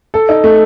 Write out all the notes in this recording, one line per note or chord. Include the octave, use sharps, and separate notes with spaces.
A4
D#4
A3